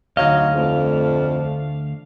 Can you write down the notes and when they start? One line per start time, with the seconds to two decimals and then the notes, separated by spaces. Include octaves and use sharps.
0.17 D2 F#3 D#4 D#5 F5
0.55 F2 A3 D4